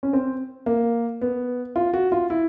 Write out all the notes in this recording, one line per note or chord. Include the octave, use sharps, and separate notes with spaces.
C#4
C4
A#3
B3
F4
F#4
F4
E4